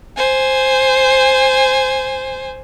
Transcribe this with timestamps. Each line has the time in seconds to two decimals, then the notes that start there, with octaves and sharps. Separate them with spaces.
0.17 C5 G#5